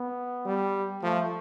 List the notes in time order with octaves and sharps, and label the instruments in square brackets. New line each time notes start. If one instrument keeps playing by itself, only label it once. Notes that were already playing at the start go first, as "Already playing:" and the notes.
Already playing: [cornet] B3
[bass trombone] G3
[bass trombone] F3 [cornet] A3